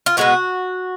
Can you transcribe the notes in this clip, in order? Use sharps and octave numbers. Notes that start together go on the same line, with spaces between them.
F4
B2 G#3 B3 F#4